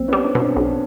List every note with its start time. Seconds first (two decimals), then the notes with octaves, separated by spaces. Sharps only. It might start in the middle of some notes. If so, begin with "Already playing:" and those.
Already playing: B1 C4
0.08 G3 B3 C#4
0.24 C4 D4
0.35 B2
0.40 C4 D4
0.56 B1